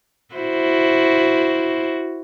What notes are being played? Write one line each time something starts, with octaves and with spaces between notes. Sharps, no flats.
E4 F#4 C5